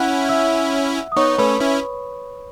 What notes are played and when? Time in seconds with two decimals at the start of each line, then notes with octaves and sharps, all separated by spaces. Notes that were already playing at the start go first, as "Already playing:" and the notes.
Already playing: C#4 E4 F#5 F#6
0.29 E5 E6
1.12 D#6
1.16 B3 D#4 C#5 C#6
1.38 A3 C#4 B4 B5
1.60 C#4 E4